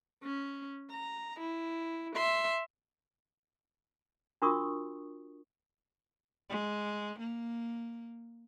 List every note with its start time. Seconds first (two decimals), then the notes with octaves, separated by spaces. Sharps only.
0.23 C#4
0.90 A#5
1.40 E4
2.15 E5 C6
4.42 D4 F4 F#4 A#4 C#6 D#6
6.50 G#3
7.19 A#3